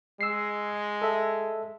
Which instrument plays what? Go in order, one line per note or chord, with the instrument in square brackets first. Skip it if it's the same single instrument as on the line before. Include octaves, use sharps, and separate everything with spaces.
[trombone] G#3 [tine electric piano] E6 C7
[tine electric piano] A4 E5